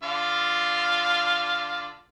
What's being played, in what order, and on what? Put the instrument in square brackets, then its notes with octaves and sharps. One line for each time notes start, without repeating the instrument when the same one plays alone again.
[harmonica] D3 F4 F5